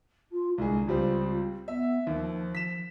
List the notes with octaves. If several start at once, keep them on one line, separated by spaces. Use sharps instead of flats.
F4
C2 D3 G#3 G#4
C#2 G3 C4 F4
B3 E5
D#2 F3
B6 E7